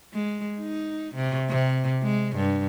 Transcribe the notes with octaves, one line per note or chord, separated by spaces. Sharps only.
G#3
D#4
C3
C3
G#3
G2